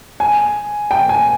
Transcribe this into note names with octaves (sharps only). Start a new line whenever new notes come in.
G#5
G5
G#5